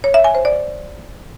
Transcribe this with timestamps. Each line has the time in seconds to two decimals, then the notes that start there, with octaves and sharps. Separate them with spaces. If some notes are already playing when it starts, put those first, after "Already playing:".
0.04 C#5
0.14 E5
0.24 G#5
0.35 C5
0.45 D5